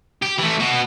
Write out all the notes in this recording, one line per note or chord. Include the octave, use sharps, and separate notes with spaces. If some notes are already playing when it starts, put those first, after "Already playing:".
G4
E3 A3
B2 F#4